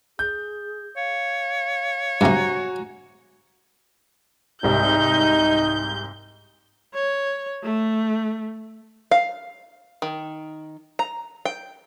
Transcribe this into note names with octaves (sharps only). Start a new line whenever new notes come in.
G#4 G6
C#5 F5
G2 C3 F#4 G#5 A#5
C2 G#2 G3 D#4 G6
C#5
A3
F5
D#3
A#5
G5